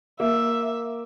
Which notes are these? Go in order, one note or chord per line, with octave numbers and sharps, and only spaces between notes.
A#3 E5